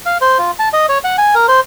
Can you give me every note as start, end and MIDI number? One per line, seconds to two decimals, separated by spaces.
0.06 0.17 77
0.21 0.38 72
0.38 0.51 65
0.59 0.69 81
0.73 0.86 75
0.89 0.98 73
1.04 1.16 78
1.18 1.35 80
1.35 1.46 70
1.48 1.60 72